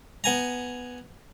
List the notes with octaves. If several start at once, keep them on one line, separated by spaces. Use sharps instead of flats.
B3 G#5 A#5